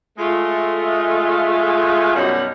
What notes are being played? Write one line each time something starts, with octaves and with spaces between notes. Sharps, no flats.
G#3 A3 F4
F#2 B2 G3 C#4 D#4 F#5